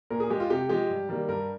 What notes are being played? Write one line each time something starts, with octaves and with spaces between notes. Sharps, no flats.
A#2 A#4
G#4
G#3 G4
F4
C3 G4
F3 G#3 G4
G2
D#3 G3 A#3
G2 A#4